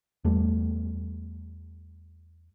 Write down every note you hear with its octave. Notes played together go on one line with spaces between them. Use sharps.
E2 G3 A3